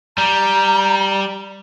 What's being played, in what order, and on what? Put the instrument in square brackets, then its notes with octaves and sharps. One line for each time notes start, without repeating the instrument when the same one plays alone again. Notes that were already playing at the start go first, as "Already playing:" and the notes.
[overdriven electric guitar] G3 [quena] A#5